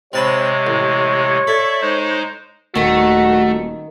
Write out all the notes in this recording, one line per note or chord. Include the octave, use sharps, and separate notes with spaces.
C3 G#3 C4 C#5 A5 B5
A1
A4 D5 E5
G#3 D#4 C5
D#1 D#3 A3 F#4 A#5